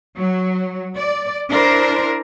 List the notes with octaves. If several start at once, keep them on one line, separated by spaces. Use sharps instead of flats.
F#3
D5
D4 E4 A#4 C5